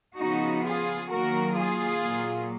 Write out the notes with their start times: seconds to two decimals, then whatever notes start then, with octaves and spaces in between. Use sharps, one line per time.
0.18 C#3 F3 B3 D#4 F#4
0.64 F4 G#4
1.10 D#3 F#3 A#3 F#4 A#4
1.56 F4 G#4
2.02 A#2 F#3 A#3